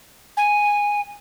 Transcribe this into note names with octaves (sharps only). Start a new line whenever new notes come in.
G#5